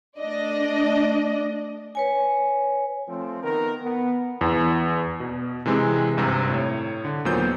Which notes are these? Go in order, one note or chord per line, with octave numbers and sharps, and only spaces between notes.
A3 D4 D5 D#5
B4 C#5 G#5
F3 A3 C4
D#3 B3 A#4
B3
E2
B2
C3 E3 G#3 C4
G#1 G2 C3 A#5
A2 C#5
D3
D#2 A#2 F#3 B3 C5 G6